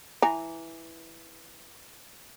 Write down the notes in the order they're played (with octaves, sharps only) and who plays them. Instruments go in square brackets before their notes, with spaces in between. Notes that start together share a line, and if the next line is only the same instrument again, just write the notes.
[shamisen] E3 G#5 A#5